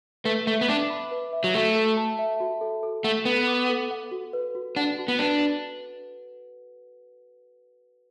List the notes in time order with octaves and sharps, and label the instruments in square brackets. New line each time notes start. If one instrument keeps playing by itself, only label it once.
[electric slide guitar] A3 [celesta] B4
[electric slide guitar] A3 [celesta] E5
[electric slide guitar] B3
[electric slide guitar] D4 [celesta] D6
[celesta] B5
B4
E5
[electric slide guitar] F#3
[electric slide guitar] A3 [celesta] F#4
[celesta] A4
A5
E5
F#4
A4
A4
[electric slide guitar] A3 [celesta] F#5
[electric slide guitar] B3 [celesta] A4
[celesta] D6
A4
F#5
F#4
B4
F#4
[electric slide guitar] D4 [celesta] F#5
[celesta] F#4
[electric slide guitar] B3
[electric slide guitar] D4 [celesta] B4